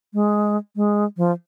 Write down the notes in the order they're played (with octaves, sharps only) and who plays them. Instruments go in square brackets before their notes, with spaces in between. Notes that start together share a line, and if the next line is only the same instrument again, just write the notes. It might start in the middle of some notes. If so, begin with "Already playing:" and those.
[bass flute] G#3
G#3
F3